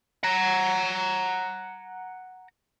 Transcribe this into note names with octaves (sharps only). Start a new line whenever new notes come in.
F#5 A#5